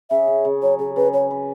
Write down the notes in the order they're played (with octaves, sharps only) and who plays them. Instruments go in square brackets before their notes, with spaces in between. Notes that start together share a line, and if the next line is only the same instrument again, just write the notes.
[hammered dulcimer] C#3 [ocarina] E5
[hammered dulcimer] C#3
C#3
[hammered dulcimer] F#3 [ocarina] C#5
[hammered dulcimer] C#3 [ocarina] G#4
[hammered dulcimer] C#3 [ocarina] B4
[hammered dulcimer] B4 [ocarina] C#5
[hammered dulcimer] B4